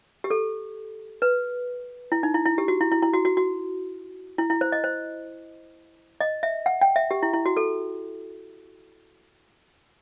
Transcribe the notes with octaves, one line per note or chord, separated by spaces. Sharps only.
G4
A4
B4
E4
D#4
E4
E4
G4
F#4
E4
E4
E4
F#4
F#4
F#4
E4
E4
C5
D#5
C5
D#5
E5
F#5
G5
E5
G4
E4
E4
F#4
A4